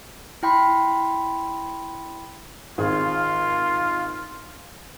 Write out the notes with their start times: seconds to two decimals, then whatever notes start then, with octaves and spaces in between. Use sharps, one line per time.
0.43 E4 G5 B5 C6
2.78 G#1 C4 F4 G#4